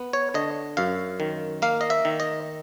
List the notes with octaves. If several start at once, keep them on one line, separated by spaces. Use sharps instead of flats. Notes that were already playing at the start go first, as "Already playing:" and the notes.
Already playing: B3
C#5
D3 D#5
F#2 F5
D#3
A#3 F5
D#5
E5
D#3
D#5